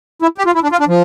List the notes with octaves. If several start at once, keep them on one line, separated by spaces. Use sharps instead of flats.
E4
G4
F4
E4
D4
F4
D4
F3